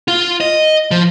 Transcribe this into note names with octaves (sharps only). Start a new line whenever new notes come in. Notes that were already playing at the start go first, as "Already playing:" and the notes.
F4
D#5
F3